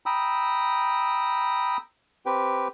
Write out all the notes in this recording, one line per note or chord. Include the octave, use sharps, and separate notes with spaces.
G5 A#5 B5 D#6 E6
C4 G4 B4 G5